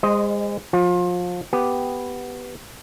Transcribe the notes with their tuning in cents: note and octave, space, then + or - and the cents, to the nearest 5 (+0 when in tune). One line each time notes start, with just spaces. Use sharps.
G#3 -30 C5 +0 D#5 +0
F3 +30 F4 +30
B3 +0 G4 +0